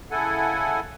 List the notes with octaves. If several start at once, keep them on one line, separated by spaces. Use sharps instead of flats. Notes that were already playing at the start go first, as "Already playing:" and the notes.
C#3 E4 A4 F#5 G#5